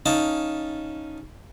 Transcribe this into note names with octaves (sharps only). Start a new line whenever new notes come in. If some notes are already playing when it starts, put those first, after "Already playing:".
C#4 D#4 F5 A5